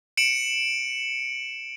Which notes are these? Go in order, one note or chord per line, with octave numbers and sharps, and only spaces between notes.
C#7 D7 E7 F#7